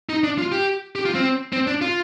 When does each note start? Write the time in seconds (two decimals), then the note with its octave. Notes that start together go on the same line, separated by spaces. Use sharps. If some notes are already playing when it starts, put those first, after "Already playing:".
0.09 D#4
0.24 D4
0.38 F4
0.52 G4
0.96 G4
1.05 F4
1.15 C4
1.53 C4
1.67 D4
1.81 F4